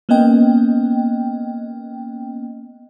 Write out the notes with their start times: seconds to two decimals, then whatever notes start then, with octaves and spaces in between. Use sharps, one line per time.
0.09 A#3 B3 C#4 D#5 G5